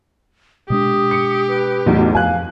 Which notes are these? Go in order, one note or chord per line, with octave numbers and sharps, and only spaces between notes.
B2 G#3 D4 G4 D#6
C#7
B4
B1 E2 A2
F2 F5 G#5 F#6